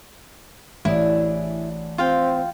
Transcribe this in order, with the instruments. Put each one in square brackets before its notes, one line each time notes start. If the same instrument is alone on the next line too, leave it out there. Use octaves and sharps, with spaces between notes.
[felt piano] A1 [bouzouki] D4 G#4 [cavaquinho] E4
[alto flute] C4 [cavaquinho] F4 F5 G5